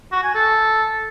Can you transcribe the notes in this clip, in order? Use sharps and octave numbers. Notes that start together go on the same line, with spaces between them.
F#4
G#5
A4